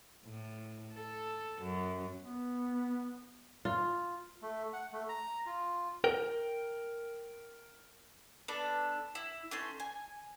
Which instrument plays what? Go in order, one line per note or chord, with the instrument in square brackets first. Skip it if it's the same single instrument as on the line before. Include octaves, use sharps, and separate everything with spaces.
[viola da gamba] A2
A4
F#2
[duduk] B3
[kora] F4
[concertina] A3
F#5
A3
A#5
F4
[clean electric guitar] A#4 G5
[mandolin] B3 D4 A4
E4
A3 C#4 C6
G#5